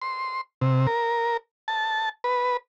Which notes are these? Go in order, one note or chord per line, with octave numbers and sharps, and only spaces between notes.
C6
C3
A#4
A5
B4